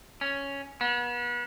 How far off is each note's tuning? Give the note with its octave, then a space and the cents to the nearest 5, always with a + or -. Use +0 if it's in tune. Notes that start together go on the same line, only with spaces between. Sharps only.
C#4 +5
B3 -35